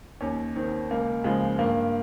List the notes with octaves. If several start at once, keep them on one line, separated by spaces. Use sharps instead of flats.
D#2 C#4
D#3 C4
C#2 A#3
C#3 F3 G#3
G2 A#3